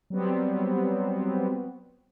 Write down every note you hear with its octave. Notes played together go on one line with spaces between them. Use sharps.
F#3 G3 B3 C4